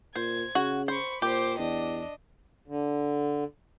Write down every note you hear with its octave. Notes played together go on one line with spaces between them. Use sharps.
A#2 C5 G#6
C#3 F#4
C5 B5 C#6
A#2 G4 C5 D6
E2 D4 D#5
D3